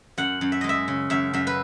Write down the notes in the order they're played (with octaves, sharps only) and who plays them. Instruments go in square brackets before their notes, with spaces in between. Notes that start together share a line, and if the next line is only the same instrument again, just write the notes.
[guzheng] F#2 F#5
F#2
E5
G#3 D#5
E5
C#3
F#2 E5
F#2 E5
B4